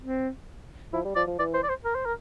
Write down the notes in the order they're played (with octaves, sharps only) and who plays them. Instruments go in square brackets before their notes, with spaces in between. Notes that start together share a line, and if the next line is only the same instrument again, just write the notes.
[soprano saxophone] C4
[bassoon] F3 [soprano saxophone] E4
[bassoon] G3
[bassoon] F3 [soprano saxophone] D5
[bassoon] F3
[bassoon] E3 [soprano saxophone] D5
[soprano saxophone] C5
D5
C5
A#4
C5
A#4